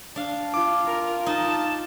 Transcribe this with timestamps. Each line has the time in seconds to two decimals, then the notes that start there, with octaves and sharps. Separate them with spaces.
0.16 D4 F5
0.54 F4 D6
0.86 A#4
1.26 D#4 A5